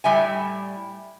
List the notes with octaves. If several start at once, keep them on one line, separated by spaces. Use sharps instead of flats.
A2 G3 E5 G#5